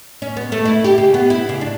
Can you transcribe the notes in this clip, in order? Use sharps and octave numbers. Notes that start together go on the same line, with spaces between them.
C#4
B3
A3
E4
G4
C#3
B3
E4
C#3
D4